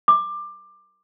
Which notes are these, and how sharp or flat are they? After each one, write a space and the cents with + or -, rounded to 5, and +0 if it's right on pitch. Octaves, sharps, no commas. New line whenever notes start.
D6 +15